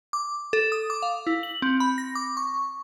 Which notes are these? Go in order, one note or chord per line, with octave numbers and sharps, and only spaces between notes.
D6
A4
D#6
D6
F5
E4
F#7
C4
B5
A#6
D6
C#6